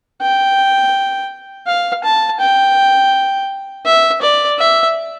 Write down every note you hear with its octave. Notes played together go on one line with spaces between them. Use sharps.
G5
F5
A5
G5
E5
D5
E5